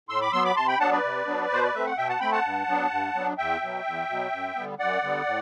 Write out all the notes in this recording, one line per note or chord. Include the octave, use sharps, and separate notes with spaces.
A2 C6 E6
B5 D6
F#3 B3 C6 E6
B5 D6
C3 A5 C6
G5 B5
F#3 B3 D4 F#5 A5
B4 D5
C3
F#3 B3 D4
B2 C5
D5
A3 C4 E5
F#5
B2 E5 G5
F#5 A5
A3 C4 G5 B5
F#5 A5
G2
F#3 B3 D4
G2
F#3 B3 D4
E2 E5 G5
B2 F#3
E2
B2 F#3
F#2
D3 G3 B3
F#2 D5 F#5
D3 G3 B3
A2